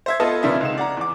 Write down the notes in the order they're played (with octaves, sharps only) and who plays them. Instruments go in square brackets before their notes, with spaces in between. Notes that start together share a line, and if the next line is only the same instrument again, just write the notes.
[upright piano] C5 E5 G#6
B3 F4 A4 B4 D#5 A5
F2 A#2 C#3 F3 D4 E5
C#2 D#4 E7
D5 F#5 A#5
E2 D6